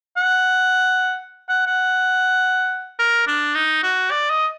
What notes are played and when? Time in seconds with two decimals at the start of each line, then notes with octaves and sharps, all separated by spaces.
0.17 F#5
1.49 F#5
1.67 F#5
2.99 A#4
3.27 D4
3.55 D#4
3.83 F#4
4.11 D5
4.30 D#5